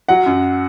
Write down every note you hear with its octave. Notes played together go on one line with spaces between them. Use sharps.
F#3 F#5
F#2